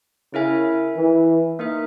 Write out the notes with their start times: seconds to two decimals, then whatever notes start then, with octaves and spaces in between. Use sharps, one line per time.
0.33 C#3 E4 A#4 E5 G#5
0.97 E3
1.59 A#3 D#4 A#4 E5